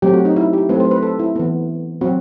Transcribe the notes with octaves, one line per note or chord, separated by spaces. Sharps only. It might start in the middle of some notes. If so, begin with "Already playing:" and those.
F#3 A3 C4 G4
F#4
D#4
E4
G4
F#3 A3 C4 B4
C5
B4
A4
E4
E3 B3
F#3 C4 F#4